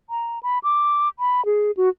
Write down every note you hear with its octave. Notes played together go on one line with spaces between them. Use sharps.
A#5
B5
D6
B5
G#4
F#4